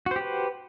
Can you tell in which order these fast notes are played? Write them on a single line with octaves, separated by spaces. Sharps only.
F#4 C5 G4 B4